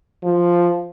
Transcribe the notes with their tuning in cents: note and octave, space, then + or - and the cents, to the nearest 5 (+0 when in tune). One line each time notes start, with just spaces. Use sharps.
F3 +0